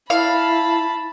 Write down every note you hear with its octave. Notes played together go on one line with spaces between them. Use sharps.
E4 F5 A5 B5